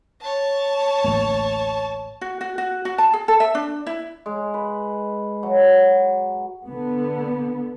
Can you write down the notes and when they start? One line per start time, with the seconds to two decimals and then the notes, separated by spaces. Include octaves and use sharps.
0.22 C#5 A5
1.04 A1 D2 A#3
2.21 F#4
2.41 F#4
2.58 F#4
2.85 F#4
2.98 A5
3.13 G#4
3.28 A4
3.40 E5
3.55 D4
3.87 E4
4.26 G#3
4.54 B4
5.43 F#3
6.67 D3 B3